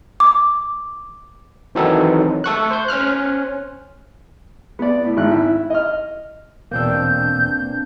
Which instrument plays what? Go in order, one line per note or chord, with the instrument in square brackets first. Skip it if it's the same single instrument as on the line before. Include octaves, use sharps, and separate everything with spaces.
[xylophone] D6
[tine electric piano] D#3 E3 F#3 C4 D#4 A4
A3 A4 C#6 F#6
C5 G6
C#4 C5 F6 F#6
[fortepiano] B3 D5
A2
G#1 F#6
E4
D#5 F6
[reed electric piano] E2 B2 E6 [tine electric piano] A#3 C4 D4 [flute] G6